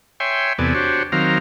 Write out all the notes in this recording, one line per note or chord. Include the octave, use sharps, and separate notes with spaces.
C#5 E5 G5 G#5 C6
E2 C3 B3 A4 D5 G#5
D4 F#4 G4 C5 C#5
D#3 F#3 C4 F5 A#5